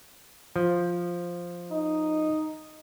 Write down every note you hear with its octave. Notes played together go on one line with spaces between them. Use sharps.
F3
D#4